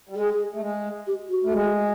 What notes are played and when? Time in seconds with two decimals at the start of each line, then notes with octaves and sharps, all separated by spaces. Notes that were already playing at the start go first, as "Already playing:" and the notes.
0.09 G3
0.16 G#3 G#4
0.54 A3
0.61 G#3
1.07 G4
1.29 F#4
1.44 A3
1.53 G#3